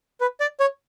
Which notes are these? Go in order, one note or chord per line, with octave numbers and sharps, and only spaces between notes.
B4
D5
C#5